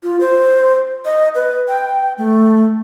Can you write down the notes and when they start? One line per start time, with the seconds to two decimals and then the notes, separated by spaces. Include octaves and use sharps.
0.03 F4
0.20 C5
1.05 D#5
1.35 B4
1.68 G5
2.18 A3